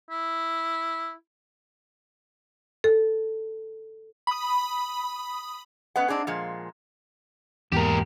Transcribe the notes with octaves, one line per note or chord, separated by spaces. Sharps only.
E4
A4
B5 D#6
B3 C#4 B4 D#5 F#5
C4 D4 D#4 G#4
A#2 F3 G#3
E2 G#2 A#3 G4 A#4